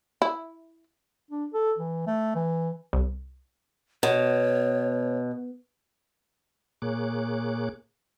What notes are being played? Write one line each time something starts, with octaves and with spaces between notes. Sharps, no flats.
E4
D4
A4
E3
A3
E3
C2
B2 C#5
A#2 A#3 G#4 C#5 D6 F#6